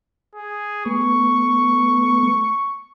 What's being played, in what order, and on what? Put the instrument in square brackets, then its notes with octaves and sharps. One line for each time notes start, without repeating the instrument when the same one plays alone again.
[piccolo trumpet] G#4
[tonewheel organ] A3 B3 [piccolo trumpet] C#6